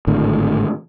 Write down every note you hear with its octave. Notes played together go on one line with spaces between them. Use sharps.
G#1 A2 D3